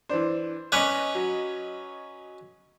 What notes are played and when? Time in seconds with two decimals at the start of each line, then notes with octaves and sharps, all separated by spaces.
0.09 E3 D4 C5
0.72 C#4 B4 C#5 D#5 C#6 D6 F#6
1.15 F#3